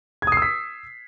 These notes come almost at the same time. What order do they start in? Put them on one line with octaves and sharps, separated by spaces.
G#6 D#6 C7 E6 B6